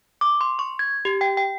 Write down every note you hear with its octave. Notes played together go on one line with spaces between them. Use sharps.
D6
C6
C#6
G#6
G4
G5
G5